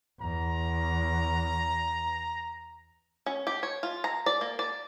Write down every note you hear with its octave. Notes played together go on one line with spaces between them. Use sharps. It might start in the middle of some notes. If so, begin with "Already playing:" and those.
E2 A#5
C#4
G4
C#5
F4
A#5
D5
A#3
D5